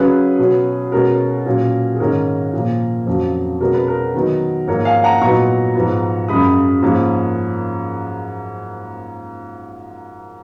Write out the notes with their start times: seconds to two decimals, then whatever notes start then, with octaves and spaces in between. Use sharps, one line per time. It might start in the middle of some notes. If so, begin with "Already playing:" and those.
Already playing: C#3 F#3 C#4 G#4 B4
0.38 B2 F#3 C#4
0.92 B2 G#3 C#4 A#4
1.46 A#2 F#3 C#4
1.94 G#4
2.00 G#2 D#3 G#3 C#4 A#4
2.53 A#2 F3 A#3
3.06 F2 C#3 F#3
3.60 B2 G#3 C#4 A#4
3.74 B4
3.88 A#4
4.14 D#3 F#3 B3 D#4
4.67 G#2 F3 A#3 A#4 C#5
4.85 F5 G#5
5.04 F#5 A#5
5.21 A#2 F#3 B3 D#4 A#5 C#6
5.75 G#2 F3 B3
6.28 F#2 C#3 G#3 B5 D#6
6.82 G#2 F3 A#3 C#4